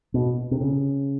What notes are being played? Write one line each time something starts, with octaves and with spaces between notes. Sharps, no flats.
B2
C3
C#3